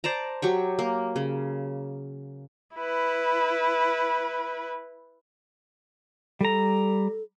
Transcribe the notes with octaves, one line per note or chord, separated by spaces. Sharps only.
C5 D5 A5 A#5
F#3 G4 C#6
A#3
C#3
E4 B4
G3 A4 A#5